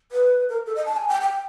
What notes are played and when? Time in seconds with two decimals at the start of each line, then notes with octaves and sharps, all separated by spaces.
0.12 B4
0.49 A#4
0.66 A4
0.76 D#5
0.86 A5
0.96 G#5
1.09 G5
1.21 G5